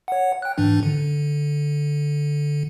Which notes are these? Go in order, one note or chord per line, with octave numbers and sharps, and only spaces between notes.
C#5 F#5
G5 F#6
G#2 E3 D4
D3